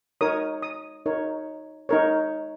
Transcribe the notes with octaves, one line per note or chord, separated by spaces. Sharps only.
D#4 A#4 C#5 D#6
D#6
D#4 A#4 C#5
D#4 A#4 C#5